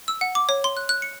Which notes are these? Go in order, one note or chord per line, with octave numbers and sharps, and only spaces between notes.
E6
F#5
D6
C#5
C6
F#6
F#6
C#7